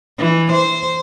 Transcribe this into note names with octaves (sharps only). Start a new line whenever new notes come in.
E3
C5